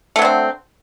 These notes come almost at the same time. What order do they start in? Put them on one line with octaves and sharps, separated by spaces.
A3 F#3 D3 C4